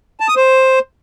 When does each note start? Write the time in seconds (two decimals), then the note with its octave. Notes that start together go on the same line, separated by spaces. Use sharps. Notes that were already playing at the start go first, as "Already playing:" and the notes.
0.20 A5
0.28 D#6
0.36 C5